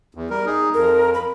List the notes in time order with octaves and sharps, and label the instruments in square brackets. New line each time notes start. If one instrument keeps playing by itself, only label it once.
[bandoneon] E2
G3 A#4
D#4 G#4
[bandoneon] F2 [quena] A#4
[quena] B5